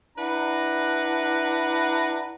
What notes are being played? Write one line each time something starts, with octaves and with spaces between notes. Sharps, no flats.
D4 E4 B4 F#5 A#5